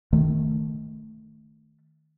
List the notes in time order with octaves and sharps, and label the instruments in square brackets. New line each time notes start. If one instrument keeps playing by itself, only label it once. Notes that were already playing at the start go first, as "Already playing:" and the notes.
[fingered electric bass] D#3 A3